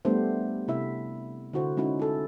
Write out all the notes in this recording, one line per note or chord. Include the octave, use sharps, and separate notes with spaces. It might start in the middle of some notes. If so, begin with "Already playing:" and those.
G3 A3 B3 D4 G4 C5
C3 E4 E5
D3 E4 F#4 C5
G#3 C#4 D#4 E4 F#4
E4 A4